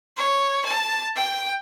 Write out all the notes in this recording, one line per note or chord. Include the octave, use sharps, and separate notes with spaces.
C#5
A5
G5